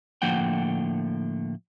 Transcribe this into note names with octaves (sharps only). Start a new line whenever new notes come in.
A2 D3 F3 A#3 F#5 G5